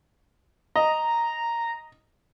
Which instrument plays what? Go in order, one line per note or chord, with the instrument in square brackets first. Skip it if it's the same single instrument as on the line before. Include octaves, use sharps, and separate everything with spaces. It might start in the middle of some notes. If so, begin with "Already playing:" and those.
[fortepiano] D#5 [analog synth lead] A#5